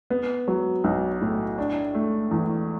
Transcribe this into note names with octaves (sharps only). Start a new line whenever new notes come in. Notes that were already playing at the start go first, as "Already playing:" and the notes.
B3
F#3
B1
A2
D4
A3
E2